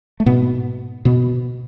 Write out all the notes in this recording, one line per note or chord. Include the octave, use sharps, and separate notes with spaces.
A3
G#2 B2 B3
B2 B3